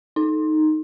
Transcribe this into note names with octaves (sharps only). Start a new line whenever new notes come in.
D#4